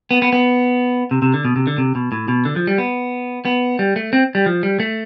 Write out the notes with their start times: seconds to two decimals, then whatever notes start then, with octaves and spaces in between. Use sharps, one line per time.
0.11 B3
0.22 B3
0.33 B3
1.11 C3
1.22 C3
1.34 D3
1.45 B2
1.56 C3
1.67 D3
1.78 C3
1.95 B2
2.12 A2
2.28 B2
2.45 D3
2.56 F3
2.67 G3
2.78 B3
3.45 B3
3.79 G3
3.96 A3
4.13 C4
4.35 G3
4.46 F3
4.63 G3
4.80 A3